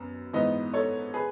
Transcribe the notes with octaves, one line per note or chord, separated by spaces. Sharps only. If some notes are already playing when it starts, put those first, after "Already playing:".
Already playing: F#2 B3
G#2 E3 B3 B4 D#5
A4 C#5
G#4 B4